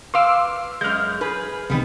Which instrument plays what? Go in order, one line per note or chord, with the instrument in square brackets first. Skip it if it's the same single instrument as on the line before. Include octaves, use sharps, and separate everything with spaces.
[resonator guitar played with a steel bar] B4 F5 [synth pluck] C6 D6 E6
[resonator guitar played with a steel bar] F#2 G#3 [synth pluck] F6 G6
[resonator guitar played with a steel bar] G#4 B4
[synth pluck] C2 D#3 [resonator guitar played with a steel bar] G3 B3